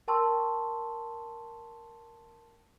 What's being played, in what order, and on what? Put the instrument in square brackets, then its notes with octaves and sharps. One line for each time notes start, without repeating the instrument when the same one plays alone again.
[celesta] A#4 G5 A5 C6 C#6 E6